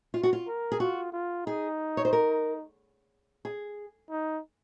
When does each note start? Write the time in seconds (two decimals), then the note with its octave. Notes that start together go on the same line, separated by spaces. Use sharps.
0.14 F4
0.23 F#4
0.33 F4
0.48 A#4
0.72 G#4
0.80 F4 F#4
1.13 F4
1.46 D#4 G#4
1.97 C#5
2.05 C5
2.13 A#4
3.45 G#4
4.10 D#4